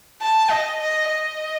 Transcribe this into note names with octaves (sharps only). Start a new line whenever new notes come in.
A5
D#5
D#5
D#5